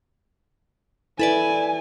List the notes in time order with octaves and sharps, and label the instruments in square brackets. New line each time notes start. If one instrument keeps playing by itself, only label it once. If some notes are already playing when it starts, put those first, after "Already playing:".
[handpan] E4 [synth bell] A4 B4 D5 [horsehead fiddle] G#5